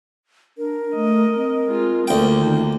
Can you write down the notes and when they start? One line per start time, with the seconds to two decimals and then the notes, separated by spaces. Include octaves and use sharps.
0.58 D4 A#4
0.95 A3 D#5
1.36 C4
1.67 G#3 F4
2.08 D2 F3 A#3 G5
2.38 D#3